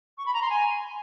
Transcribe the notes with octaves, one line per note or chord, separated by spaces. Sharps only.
C#6
B5
A#5
C6
G#5